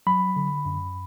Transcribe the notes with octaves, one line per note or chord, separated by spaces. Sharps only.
F#3 B5
D3
F#2